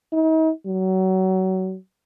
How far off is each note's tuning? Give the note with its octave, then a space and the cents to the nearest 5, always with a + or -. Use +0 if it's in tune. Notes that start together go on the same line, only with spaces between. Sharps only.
D#4 +40
F#3 +25